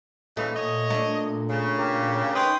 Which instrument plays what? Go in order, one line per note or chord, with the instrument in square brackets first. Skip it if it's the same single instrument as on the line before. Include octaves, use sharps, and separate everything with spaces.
[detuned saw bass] A#2 [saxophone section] C#3 E3 D#4 [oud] A3
[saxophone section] C#5 D#5
[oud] A3 D4
[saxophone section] C#3
[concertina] G4 A#4
[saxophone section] C#4 G#4 B4 [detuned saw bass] D#4 [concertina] G5 C6 D#6